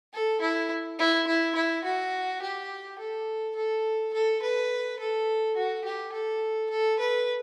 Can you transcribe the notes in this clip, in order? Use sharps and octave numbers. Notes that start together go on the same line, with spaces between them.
A4
E4
E4
E4
E4
F#4
G4
A4
A4
A4
B4
A4
F#4
G4
A4
A4
B4